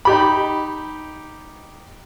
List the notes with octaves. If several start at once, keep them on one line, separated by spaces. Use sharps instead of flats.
D#4 G4 B5